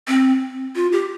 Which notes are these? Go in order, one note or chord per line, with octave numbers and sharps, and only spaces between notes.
C4
F4
G4